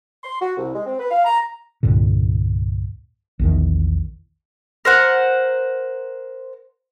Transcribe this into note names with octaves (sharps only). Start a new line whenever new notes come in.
C6
F#4
C2
G#3
C4
B4
F5
A#5
C2 G2 A#2 D3
A#1 E2 D#3
A#4 C5 F#5